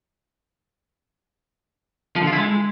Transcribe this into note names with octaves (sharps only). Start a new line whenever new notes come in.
F3
D3
F4
E4
G#3